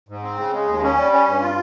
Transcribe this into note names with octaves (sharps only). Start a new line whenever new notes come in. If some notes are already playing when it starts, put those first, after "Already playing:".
G#2
C4
C#3
G#3
D#2
C#4
G3
C#4
G2
F4